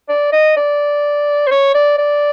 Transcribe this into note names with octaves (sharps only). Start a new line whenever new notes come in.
D5
D#5
D5
C5
C#5
D5
D5